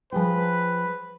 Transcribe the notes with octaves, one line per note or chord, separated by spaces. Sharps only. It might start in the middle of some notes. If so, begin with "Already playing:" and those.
F3 G#4 B4 G5